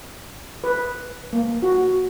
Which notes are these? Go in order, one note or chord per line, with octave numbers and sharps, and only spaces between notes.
B4
A#3
F#4